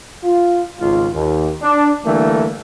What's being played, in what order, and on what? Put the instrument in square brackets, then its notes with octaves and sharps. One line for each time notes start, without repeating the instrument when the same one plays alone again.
[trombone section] F4
G#1 C#2 F4
D#2
D4
D3 E3 G3 A3 A#3